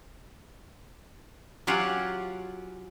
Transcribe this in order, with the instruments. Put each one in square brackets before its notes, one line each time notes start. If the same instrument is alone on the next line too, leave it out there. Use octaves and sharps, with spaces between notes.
[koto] F#3 C#4 F4 G4 F#5